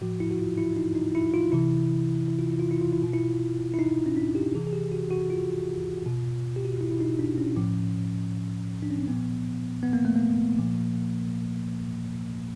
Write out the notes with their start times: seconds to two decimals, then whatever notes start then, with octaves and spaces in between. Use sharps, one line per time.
0.01 A2 F3 F#4
0.20 E4
0.31 F#4
0.39 F4
0.58 E4
0.76 D#4
0.95 D#4
1.15 E4
1.34 F4
1.52 C3 E3 E4
2.28 E4
2.39 F4
2.50 E4
2.60 F4
2.71 E4
2.81 F4
2.92 E4
3.02 B2 F4
3.13 E4
3.74 E4
3.79 D#4
4.06 C#4
4.17 D4
4.35 G4
4.55 C3 E3 G#4
4.67 G#4
4.73 G4
4.92 F#4
5.11 F#4
5.30 F4
6.06 B2
6.56 G4
6.65 F#4
6.73 F4
6.81 E4
6.91 E4
7.01 D#4
7.19 D4
7.38 C#4
7.56 A2 F3
8.82 D4
8.91 C#4
8.99 C4
9.07 A#2 F3 B3
9.83 B3
9.93 A#3
10.05 A3
10.16 A#3
10.59 A#2 F3